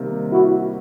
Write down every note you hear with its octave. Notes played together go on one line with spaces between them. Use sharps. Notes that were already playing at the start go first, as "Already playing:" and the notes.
Already playing: C3 D#3 G3 A#3
E4 F#4